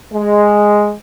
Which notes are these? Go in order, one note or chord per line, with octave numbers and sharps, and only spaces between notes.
G#3